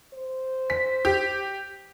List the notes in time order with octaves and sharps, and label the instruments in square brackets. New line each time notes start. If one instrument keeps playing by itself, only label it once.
[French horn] C5
[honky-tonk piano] B6
G4